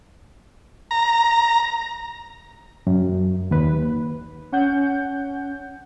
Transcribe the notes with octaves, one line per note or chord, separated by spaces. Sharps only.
A#5
F#2
D#2 B4
C#4 F#5 G6